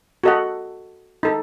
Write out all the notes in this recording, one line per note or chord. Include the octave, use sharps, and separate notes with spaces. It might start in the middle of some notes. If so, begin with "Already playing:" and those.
F#4 A4 D#5 F#5
D#4 A4